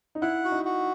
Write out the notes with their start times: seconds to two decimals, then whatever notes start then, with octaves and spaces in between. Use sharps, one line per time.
0.15 D#4
0.22 E4 F#5
0.45 F#4
0.52 D#4
0.65 F#4